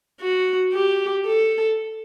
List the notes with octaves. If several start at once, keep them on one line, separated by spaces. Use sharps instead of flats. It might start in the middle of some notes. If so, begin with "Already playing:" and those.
F#4
G4
A4